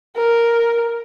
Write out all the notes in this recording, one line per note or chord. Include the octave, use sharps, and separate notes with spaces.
A#4